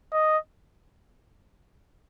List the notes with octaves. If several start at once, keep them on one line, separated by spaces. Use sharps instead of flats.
D#5